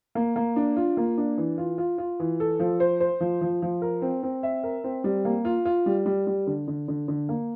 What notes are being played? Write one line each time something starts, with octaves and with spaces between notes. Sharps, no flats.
A#3
A#3
D4
F4
A#3
D4
E3
F4
F4
F4
E3
A4
F3
C5
C5
F3
F3
F3
A#4
C4
C4
E5
A#4
C4
G3
A#3
F4
F4
G3
G3
G3
D3
D3
D3
D3
A#3